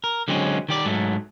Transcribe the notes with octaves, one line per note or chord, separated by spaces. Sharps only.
A#4
D3 F#3 G#3 C4 C#4
D#3 G4 D5
G#2 F#3 A3